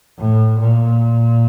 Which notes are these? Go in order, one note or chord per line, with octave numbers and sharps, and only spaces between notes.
A2
A#2